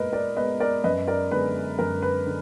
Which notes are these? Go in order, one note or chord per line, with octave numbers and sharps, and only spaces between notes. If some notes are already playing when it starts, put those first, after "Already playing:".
Already playing: A#2 G#3 B3 A#4 B4 D#5
A#4 D5
G#3 B3 B4 D#5
A#4 D5
F#2 B4 D#5
A#4 D5
D3 G#3 B3 B4
F#2 A#4
B4
D3